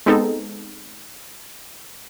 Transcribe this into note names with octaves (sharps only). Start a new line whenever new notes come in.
G#3 B3 C4 D#4 G#4 A4